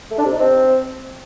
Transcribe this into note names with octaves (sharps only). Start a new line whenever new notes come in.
A3
D4
C3
D#4
C4